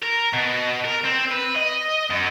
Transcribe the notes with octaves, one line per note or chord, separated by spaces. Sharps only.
A#4
B2
A#4
C4
B4
D#5
F#2